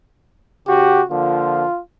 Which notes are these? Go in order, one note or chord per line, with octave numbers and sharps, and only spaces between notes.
C#3 F#4 G4
D3 F3 A#3 F4